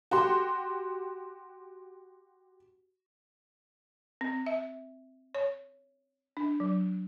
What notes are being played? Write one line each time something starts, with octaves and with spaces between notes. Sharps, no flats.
F#4 G4 C6
C4
E5
C#5
D4
F#3